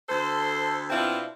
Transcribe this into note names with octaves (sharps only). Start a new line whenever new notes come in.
D2 A4 C5
B2 C4 D4 E4 F4